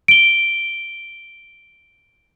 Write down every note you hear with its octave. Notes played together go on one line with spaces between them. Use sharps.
D7 G7